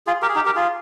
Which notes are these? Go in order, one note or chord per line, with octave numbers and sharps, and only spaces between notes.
F4 G#4
G4 A#4
G#4
D#4 G4
G4 A#4
F4 G#4